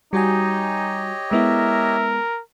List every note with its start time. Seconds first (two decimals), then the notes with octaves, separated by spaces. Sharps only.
0.13 G3 D#4 F#4 G4 C#5 D#5 G#5
1.31 G#3 B3 E4 A#4 E5